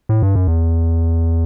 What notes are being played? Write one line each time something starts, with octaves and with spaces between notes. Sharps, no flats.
A2
G2
F#2
E2